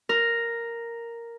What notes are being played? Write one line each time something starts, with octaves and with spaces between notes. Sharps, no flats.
A#4